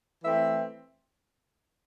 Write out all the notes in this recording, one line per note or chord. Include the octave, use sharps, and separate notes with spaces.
E3 A3 C4 E5